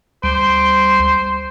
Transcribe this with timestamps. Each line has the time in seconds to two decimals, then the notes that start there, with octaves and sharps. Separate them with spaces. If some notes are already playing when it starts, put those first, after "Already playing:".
0.23 D2 G3 C5